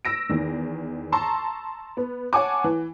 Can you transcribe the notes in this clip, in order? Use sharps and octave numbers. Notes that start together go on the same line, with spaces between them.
E6 A#6 D7
E2 D#3
A5 A#5 C6 C#6 E6
B3
C#5 F#5 G#5 A5 D6
E3